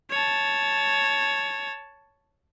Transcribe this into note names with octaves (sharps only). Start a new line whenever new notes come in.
C#5 A5